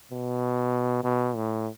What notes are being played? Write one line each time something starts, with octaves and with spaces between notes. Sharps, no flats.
B2
B2
A2